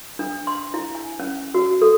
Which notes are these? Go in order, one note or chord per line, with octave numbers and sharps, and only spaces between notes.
D4
C6
E4
G#5
C#4
F#4
A4